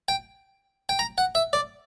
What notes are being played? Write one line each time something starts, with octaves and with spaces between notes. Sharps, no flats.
G5
G5
A#5
F#5
E5
D5